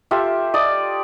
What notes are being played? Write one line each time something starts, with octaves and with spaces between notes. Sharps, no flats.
F4 G4 A4 E5
A4 D5 D#5